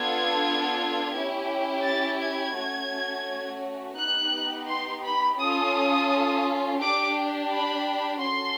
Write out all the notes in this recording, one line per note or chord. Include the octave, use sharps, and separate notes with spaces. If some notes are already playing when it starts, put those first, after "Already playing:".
Already playing: B3 D4 F4 A4 G#6
C#4 E4 G4
A6
G#6
A3 C#4 F#4
B3 D#4 G4 F#6
C6
B5
C#4 F4 A4 D#6
D4 G4 D6
B5
C#4 F#4 A4 C6